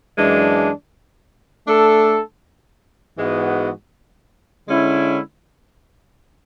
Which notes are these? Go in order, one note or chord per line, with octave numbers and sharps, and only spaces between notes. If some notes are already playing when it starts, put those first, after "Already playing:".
F#2 E3 G#3 D4
A3 D4 A4
G#2 E3 G#3 B3 F#4
D3 G#3 C#4 E4